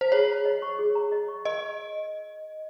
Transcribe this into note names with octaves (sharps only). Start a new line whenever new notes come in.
C5
G#4 C#5
A#5
D#5
C#6
G#4
A#5
D#5
C#6
A#4 D#5